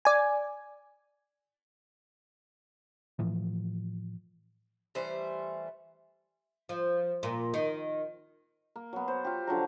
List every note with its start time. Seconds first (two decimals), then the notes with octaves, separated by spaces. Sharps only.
0.05 D5 G#5
3.19 A2 E3 F3
4.95 E3 G3 A3 C5
6.69 F3
7.23 A#2
7.54 D#3
8.76 A#3
8.93 F#3 B3
9.08 C5
9.25 F4 G4
9.47 D3 F3 F#3 A#5